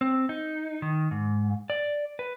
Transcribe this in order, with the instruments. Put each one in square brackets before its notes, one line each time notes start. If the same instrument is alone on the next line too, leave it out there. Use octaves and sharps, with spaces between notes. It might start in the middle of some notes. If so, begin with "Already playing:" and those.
[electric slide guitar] C4
D#4
D#3
G#2
D5
B4